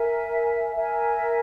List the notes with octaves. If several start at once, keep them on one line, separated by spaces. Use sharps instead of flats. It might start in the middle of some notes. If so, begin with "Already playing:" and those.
Already playing: A#4 E5 G#5
A#4 E5 G#5